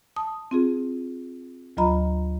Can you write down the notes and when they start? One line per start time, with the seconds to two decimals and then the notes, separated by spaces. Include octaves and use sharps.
0.16 A5 D#6
0.51 C4 F4 G#4
1.77 D2 F#3 F4 D#5 A#5 B5